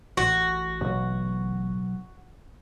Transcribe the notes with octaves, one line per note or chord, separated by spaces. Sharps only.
A1 F#4
B1 G2